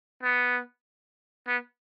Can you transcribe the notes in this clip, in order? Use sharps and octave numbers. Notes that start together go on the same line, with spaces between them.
B3
B3